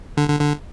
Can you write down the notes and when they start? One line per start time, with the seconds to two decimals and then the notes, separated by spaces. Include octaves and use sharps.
0.17 D3
0.29 D3
0.40 D3